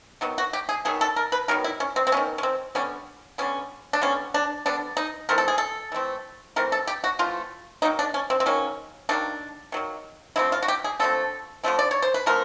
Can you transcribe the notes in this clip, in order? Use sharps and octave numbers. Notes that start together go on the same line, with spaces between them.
D#3 F#3 B3
F#4
G4
G#4
D#3 F#3 B3 G#4
A4
A#4
B4
D#3 F#3 B3 A#4
E4
C#4
C4
C4
D#3 F#3 B3 C#4
C#4
C4
D3 G3 B3 C#4
D3 G3 B3 C#4
D4
D3 G3 B3 C#4
D4
D3 G3 B3 D4
D#4
E3 A3 C4 A#4
A4
G#4
A4
E3 A3 C4
E3 A3 C4 A#4
A4
G4
F#4
E3 A3 C4 F4
D#3 F#3 A#3 D#4
D4
C#4
C4
C4
D#3 F#3 A#3 C#4
D#3 F#3 A#3 D4
D#3 F#3 A#3
D3 F3 A3 C4 E4
F4
F#4
G4
G#4
D3 F3 A3 C4 A4
D3 F3 A3 C4
D5
C#5
C5
B4
D3 F3 A3 C4 A#4